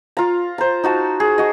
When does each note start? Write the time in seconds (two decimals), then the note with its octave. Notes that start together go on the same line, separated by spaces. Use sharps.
0.17 F4 A#5
0.58 C5 A#5
0.84 D#4 F#4 A5
1.20 G#4
1.38 F#4 D#5